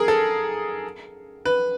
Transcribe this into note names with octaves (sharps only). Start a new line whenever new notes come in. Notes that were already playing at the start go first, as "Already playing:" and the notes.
Already playing: G#4 A#4
A4
B4